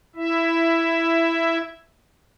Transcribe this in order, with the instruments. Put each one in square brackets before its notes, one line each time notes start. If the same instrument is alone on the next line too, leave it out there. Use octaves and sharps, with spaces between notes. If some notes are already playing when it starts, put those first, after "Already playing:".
[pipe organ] E4 E5